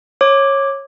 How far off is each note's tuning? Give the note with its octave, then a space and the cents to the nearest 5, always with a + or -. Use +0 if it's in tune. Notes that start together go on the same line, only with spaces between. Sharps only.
C#5 -15 D6 +0